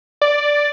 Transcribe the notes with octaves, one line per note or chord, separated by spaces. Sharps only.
D5